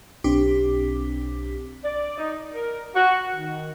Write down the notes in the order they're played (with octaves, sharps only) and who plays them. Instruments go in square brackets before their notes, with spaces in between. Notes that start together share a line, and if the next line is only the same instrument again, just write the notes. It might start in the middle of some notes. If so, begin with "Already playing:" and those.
[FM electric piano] B1 C4 D4 G4 D6 B6
[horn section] D5
D#4
A#4
F#4
D#3